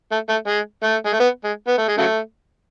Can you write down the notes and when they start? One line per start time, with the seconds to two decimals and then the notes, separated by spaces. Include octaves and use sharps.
0.12 A3
0.29 A3
0.47 G#3
0.84 A3
1.06 G#3
1.13 A3
1.20 B3
1.44 G#3
1.67 B3
1.78 A3
1.88 G#3
1.98 C#3 F#3 A3